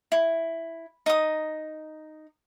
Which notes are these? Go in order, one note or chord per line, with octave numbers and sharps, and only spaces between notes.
E4
D#4 D#6